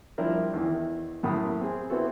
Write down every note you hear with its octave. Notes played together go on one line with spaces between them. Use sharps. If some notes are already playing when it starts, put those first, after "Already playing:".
F3 G3 D4 E4 A#4
E2 D#3 E3
F#2 A2 A#3 B5 D#6
C4 G#4
B3 C4 E4 F#4 A4